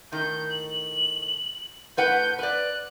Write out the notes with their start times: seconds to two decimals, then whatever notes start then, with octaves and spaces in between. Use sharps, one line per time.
0.12 A2 D#3 G6
0.50 F#7
1.97 A2 B4 F#5 G6
2.39 B4 D5 F#6